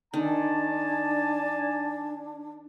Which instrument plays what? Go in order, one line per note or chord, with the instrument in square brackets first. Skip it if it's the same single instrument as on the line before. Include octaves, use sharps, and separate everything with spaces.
[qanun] D#3 [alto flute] D4 [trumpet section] G#5 A5